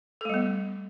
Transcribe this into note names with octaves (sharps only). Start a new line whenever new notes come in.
G3 A3 B3 A4